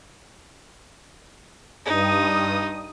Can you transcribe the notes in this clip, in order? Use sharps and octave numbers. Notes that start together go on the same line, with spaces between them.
G2 D#4 D#6